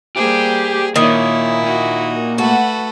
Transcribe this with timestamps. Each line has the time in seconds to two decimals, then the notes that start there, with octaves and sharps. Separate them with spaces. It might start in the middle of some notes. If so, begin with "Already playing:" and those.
0.17 G3 A#3 G4 G#4 C5
0.96 A#2 D#3 E4 C#5
1.61 D#4 F#4
2.38 A3 F#4 A4 B4 F#5